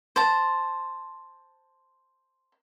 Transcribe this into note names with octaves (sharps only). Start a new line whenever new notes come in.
C5 A5